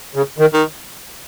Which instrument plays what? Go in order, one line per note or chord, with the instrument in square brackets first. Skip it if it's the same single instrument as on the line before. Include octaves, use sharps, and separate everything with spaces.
[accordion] C#3
D#3
[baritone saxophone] D#3